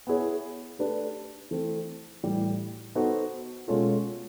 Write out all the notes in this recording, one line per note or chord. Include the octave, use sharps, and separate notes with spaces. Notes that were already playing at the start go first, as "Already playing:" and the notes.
B3 E4 G#4 C#5
A3 D4 G4 B4
E3 A3 C4
A2 E3 G3
B3 D#4 F#4 A4 C5
B2 G#3 C#4 F4 A4